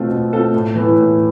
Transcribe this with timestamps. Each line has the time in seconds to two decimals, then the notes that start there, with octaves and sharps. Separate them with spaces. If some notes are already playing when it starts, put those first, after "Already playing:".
Already playing: B2 A3 C4 F4 A4
0.10 B2
0.32 A3 C4 F4 A4
0.54 A2
0.75 E3 B3 E4 A4
0.96 A2